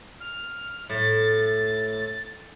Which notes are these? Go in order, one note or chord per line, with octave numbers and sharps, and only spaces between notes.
F6
A2 A6